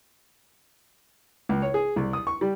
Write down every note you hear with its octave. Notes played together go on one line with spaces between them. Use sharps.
C#2
C#5
G#4
C2
D#6
C#6
G3